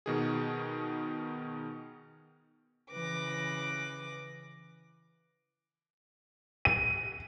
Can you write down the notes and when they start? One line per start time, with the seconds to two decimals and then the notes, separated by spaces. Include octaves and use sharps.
0.06 B2 D#3 G#4
2.91 C#3 E3 B4 D6 A#6
6.65 D#7